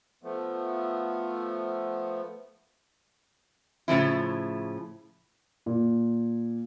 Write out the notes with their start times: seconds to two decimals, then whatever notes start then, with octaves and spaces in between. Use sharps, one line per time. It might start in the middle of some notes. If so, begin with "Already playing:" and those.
0.23 F3 A3 B3
3.88 A2 C#3 F3 E4
5.66 A#2